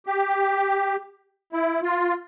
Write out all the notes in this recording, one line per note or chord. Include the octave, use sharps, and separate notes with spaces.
G4
E4
F4